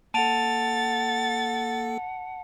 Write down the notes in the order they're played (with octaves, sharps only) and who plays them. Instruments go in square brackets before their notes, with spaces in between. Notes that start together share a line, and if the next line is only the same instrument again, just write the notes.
[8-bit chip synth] A#3 A4 [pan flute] F#5 [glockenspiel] A5 D7 F7 [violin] A6